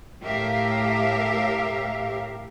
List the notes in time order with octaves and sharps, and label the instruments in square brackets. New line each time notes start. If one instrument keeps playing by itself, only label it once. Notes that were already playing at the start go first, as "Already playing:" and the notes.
[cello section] A2 G4 A#4 E5 F5